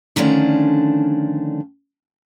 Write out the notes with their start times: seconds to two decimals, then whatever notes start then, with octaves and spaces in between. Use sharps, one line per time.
0.16 D3 D#3 F3 A3 C#4 D4